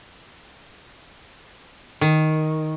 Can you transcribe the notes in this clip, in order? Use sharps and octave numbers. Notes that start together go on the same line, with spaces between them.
D#3